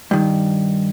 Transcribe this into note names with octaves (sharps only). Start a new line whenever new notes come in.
G2 D#3